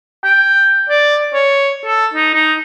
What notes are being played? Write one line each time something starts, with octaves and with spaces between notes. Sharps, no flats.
G5
D5
C#5
A4
D#4
D#4